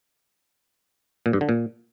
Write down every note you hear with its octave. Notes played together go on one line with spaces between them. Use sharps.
A#2
G2
D3
A#2